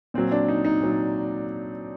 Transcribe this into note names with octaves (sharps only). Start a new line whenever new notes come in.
A#2 F#3 C4
D4
D#4
D#4
A#2 F#3